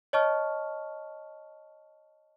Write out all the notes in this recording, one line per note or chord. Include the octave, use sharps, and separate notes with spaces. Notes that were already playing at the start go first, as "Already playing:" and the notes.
C#5 D#5 A5 C#6 F6